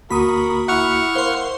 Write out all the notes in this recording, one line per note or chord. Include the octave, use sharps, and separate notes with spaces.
D2 A#3 F#4 A#4 B5 C#6 D#6
E4 F#5 C#6 F6
A#4 C5 F5 C6